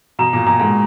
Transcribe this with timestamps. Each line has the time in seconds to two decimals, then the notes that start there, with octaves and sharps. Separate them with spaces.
0.19 B2 A#5
0.33 A#2
0.46 A#2 A#5
0.60 G#2